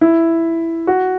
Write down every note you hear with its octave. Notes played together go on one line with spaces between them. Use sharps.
E4
F#4